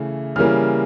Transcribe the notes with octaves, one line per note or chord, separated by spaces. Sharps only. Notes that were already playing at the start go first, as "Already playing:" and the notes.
Already playing: C#3 E3 A3
C#3 E3 G3 A#3 F6